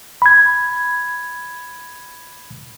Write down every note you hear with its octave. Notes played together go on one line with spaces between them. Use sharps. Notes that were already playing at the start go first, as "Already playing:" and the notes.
B5 G#6